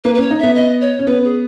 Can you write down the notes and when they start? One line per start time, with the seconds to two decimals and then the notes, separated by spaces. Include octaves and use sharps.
0.04 A#3 B4
0.15 B4
0.18 C#4 C#5
0.31 D#4
0.39 B3 E5
0.55 D#5
0.81 C#5
0.99 C#4
1.07 B3 B4
1.24 G#4